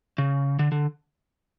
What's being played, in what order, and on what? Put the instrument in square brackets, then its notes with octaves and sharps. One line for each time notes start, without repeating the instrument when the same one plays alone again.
[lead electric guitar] C#3
D3
D3